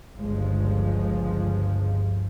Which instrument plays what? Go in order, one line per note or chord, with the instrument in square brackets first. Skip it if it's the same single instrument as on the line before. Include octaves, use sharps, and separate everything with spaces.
[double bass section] G1 C#2 F3 G#3